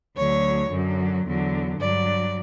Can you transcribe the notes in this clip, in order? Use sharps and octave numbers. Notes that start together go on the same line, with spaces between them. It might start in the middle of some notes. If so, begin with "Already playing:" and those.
D2 D3 F#3 C#5
F#2 D3 F#3
E2 D3 F#3
G2 F#3 D5